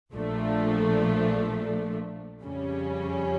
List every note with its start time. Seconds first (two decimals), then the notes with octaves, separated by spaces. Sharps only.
0.12 A#1 A#2 F3 A3 D4
2.42 F2 C#3 G3 C#4